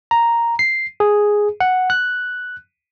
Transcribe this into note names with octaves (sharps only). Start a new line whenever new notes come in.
A#5
C7
G#4
F#5
F#6